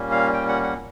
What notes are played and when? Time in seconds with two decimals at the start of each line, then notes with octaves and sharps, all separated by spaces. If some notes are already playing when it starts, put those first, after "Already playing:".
Already playing: A#2 G3 A#3 C#4
0.12 F5
0.34 G5
0.49 F#5
0.63 F#5